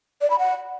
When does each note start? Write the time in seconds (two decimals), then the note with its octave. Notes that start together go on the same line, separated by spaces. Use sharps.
0.21 D5
0.30 B5
0.39 F#5